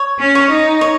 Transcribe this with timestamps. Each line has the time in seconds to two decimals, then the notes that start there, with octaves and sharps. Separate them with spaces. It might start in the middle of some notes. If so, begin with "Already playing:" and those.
Already playing: C#5
0.19 C#4
0.35 C#5
0.51 D#4
0.81 C#5